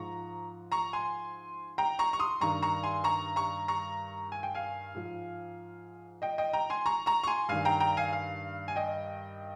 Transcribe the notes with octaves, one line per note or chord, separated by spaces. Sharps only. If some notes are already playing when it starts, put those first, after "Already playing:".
Already playing: G#2 F3 A#5 C#6
A#5 C#6
G#5 C6
G5 A#5
A#5 C#6
C#6
C6 D#6
G2 D#3 A#5 C#6
A#5 C#6
G#5 C6
A#5 C#6
A#5 C#6
A#5 C#6
G#5
G5
F5 G#5
G#2 F3
D#5 G5
D#5 G5
G5 A#5
G#5 C6
A#5 C#6
A#5 C#6
C#6
G#5 C6
G2 D#3 F5 G#5
G5 A#5
G5 A#5
F5 G#5
F5
G#5
D#5 G5